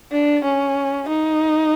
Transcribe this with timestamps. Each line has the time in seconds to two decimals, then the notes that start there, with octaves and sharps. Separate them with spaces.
0.12 D4
0.44 C#4
1.09 D#4